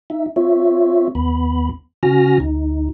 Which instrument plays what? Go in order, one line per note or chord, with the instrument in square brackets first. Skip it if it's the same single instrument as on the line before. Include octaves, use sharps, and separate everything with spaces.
[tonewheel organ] D#4 E5
C4 F4 C#5 E5
D#2 B3 B5
C#3 C#4 F#4 G#5 F6 A#6
D2 D#4